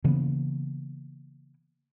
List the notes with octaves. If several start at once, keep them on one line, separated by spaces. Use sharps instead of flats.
C#3 E3 A#3 B3